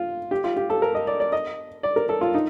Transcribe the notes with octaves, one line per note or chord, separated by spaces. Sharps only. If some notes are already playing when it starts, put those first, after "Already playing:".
Already playing: F4
G4
F4
G4
A4
A#4
D#5
D5
D5
D#5
D5
A#4
A4
F4
D#4